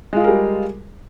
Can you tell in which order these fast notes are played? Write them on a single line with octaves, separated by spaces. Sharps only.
G#3 F4 G#4 A#4 G3